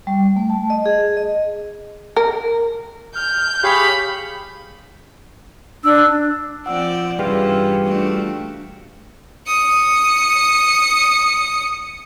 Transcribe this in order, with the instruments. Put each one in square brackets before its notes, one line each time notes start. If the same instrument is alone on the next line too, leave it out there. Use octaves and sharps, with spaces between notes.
[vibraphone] G3
A3
A5
D#5
G#4
D#5
[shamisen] A#4
[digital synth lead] F6 [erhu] G6
[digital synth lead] G4 [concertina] G#4 C#5 F5 [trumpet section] B5
[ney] D4 [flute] E6
[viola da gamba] F3 C4 D5 [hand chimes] F#5 E6
[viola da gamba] G2 E3 C#4 [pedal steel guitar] G3 F4 [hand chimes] G#4 B4 G5
[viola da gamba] A3 D4 F#4
[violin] D#6 C#7